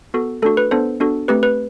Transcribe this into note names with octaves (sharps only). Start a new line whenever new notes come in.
B3 F#4 A4
A3 D4 F#4 A4
B4
B3 D4 A4 C5
B3 D4 F#4 A4
A3 C4 G4 B4
B4